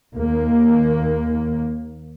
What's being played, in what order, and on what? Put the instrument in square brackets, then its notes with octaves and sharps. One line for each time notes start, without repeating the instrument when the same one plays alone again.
[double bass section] D#2 A#3